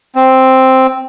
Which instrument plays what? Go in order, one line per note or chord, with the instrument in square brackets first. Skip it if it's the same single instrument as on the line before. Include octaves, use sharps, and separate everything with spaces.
[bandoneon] C4